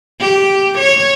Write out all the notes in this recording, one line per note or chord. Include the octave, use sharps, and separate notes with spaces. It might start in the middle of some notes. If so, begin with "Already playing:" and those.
G4
C#5